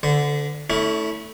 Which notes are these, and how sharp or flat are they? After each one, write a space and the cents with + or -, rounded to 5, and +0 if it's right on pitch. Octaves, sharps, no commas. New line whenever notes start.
D3 -10 C5 -45
A3 +0 C#4 +30 E4 -25